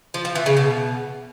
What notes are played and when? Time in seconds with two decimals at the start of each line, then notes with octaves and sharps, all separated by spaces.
0.14 F3
0.25 F3
0.35 E3
0.46 C#3
0.57 B2